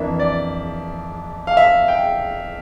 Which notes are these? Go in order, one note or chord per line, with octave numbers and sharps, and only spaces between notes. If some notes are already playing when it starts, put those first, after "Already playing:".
Already playing: F2 E3 A#3 D4 E5
D5
F5
E5
G5